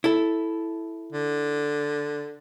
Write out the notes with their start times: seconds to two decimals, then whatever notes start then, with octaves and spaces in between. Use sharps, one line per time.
0.04 E4 A4
1.13 D3